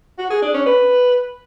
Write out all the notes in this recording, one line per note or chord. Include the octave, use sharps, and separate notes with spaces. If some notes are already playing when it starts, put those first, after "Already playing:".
F#4
G#4
D4
C#4
B4